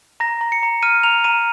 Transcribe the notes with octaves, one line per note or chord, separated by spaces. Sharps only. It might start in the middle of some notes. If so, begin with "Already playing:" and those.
A#5 A#6
A#5
C#7
A#5
F6 D#7
A#5 F7
A#5 D#7